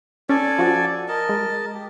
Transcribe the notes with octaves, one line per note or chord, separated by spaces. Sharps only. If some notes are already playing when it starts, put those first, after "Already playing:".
C#4 A4 D5 G#5
F3 F#4
A#4 D#5 A5
G#3
G4